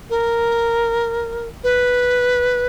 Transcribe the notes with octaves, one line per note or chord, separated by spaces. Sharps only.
A#4
B4